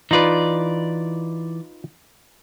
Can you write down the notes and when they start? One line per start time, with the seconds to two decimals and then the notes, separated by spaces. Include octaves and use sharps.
0.11 E3 D#4 F4 B4 D5